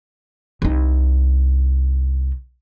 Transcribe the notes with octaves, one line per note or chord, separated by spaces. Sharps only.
C2 D#4